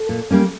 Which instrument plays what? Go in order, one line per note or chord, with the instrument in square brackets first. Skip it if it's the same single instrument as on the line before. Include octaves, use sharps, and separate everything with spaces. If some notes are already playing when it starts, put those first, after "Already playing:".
Already playing: [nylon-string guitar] A4
A#2
G3 A#3 C#4